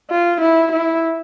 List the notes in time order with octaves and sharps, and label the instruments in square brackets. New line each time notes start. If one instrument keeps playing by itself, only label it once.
[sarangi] F4
E4
E4